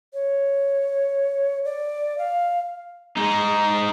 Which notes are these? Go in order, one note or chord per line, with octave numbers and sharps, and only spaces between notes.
C#5
D5
F5
G#3 D#4